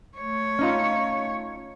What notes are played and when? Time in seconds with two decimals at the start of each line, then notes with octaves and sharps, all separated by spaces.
0.18 A3 C#5
0.59 C#4 D#4 F4